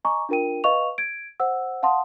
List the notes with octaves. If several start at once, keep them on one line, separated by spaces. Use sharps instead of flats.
D#5 G#5 A#5 C#6 D6
D4 F4 A#4 G5 D#7
B4 D#5 F5 C#6 F7
G#6 D7
C5 F#5 E6
F5 F#5 A5 C6 D#6